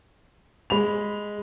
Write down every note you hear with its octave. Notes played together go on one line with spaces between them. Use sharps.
G#3 B5 F7